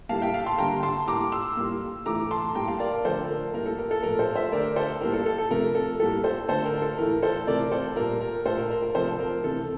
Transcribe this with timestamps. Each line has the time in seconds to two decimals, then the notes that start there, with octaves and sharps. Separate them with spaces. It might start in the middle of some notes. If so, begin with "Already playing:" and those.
0.09 A2 G3 A#3 F5 A5
0.21 E5 G5
0.34 F5 A5
0.46 A5 C6
0.58 D3 G3 A#3 G5 A#5
0.83 A5 C6
1.08 A2 G3 A#3 A#5 D6
1.32 C6 E6
1.57 A2 G3 A#3
2.06 A2 E3 A3 A#5 D6
2.31 A5 C6
2.55 A2 G3 A#3 G5 A#5
2.68 F5 A5
2.80 A#4 D5
2.92 A#4
3.05 D3 F3 A3 A4 C5
3.29 A#4
3.54 A2 G3 A#3 A#4
3.66 A4
3.79 A#4
3.91 A4
4.03 A#2 F3 A3 A#4
4.19 A4 C5
4.35 C5 E5
4.52 D3 A3 A#4 D5
4.76 A4 C5
5.01 A2 G3 A#3 A#4
5.13 A4
5.26 A4
5.38 A4
5.50 C3 F3 A3 A#4
5.75 A4
6.00 A2 G3 A#3 A4
6.24 A4 C5
6.49 D3 A3 A4 C5
6.65 A#4
6.82 A4
6.98 A2 E3 A3 A#4
7.22 A4 C5
7.47 C3 E3 A3 A#4 D5
7.72 A4 C5
7.96 A#2 G3 A#3 A#4
8.21 A#4
8.45 A#2 A3 A4 C5
8.58 A#4
8.70 A#4
8.82 A#4
8.95 C3 F3 A3 A4 C5
9.19 A#4
9.44 C3 E3 A3 A4